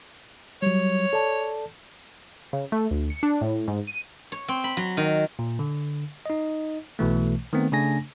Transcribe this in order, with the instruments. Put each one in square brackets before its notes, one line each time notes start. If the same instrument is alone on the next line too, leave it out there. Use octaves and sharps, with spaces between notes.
[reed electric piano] F#3 G3 [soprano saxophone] C#5
[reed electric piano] A4 D5 A5
[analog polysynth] C#3
A3
D2
C#7
D4
A2
G#2
D#7
[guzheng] C#5
C4
B5
F#3
D#3
[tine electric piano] A#2
D3
D#4 D#5
B1 B2 E3 A3
D#3 A3 B3 C4
C#3 A3 D4 G#5 A#6